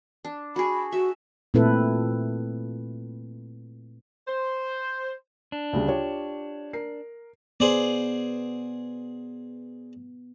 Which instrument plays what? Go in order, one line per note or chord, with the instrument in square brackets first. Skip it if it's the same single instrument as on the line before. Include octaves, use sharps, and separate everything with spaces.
[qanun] D4
[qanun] F#4 G#4 [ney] B5
[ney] F#4 [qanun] E5
[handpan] A#2 A3 C4 E4 A4 B4
[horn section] C5
[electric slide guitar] D4
[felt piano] D2 C#3 G3
F4 G4 C#5
A#4 C7
[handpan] B3 [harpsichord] G#4 C5 D5